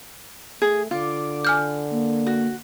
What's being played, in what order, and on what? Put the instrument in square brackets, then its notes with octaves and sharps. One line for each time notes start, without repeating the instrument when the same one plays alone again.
[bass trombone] A3 [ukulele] G#4
[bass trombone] D3 [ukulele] F4 [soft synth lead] D6
[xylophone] G#5 F6 G6
[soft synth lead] A#3
[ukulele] F#4